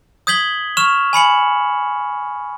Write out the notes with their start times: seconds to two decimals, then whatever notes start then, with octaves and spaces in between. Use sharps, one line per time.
0.27 D#6 G6 G#6 B6 F#7 G7
0.77 C#6 F6 E7 F7
1.13 G#5 B5 C#7 F#7